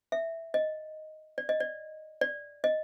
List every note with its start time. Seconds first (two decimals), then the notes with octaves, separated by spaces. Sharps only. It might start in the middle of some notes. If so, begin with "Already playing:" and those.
0.12 E5
0.54 D#5
1.38 D5
1.49 D#5
1.60 D5
2.21 D5
2.64 D#5